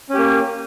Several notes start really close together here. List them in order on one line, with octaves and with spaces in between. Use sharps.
C#4 G4 A#3